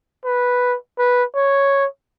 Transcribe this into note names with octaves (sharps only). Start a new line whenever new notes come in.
B4
B4
C#5